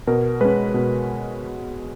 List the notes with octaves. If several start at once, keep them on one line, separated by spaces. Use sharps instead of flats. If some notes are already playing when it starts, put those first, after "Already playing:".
B2 A#4
G#3 C#4 B4
B2